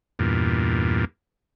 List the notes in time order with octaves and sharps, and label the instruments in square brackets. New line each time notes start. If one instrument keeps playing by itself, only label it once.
[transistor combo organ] E2 G2 A#2